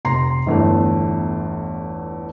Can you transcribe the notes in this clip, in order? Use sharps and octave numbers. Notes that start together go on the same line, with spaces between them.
F1 A#5 C6 C7
G1 E2 A3